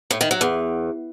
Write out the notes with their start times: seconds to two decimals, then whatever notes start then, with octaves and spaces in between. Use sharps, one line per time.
0.11 A2
0.21 D#3
0.31 F#3
0.41 E2